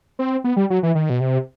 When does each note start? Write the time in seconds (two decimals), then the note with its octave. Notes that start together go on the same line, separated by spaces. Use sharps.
0.19 C4
0.44 B3
0.57 G3
0.70 F#3
0.83 E3
0.95 D#3
1.10 B2
1.20 C3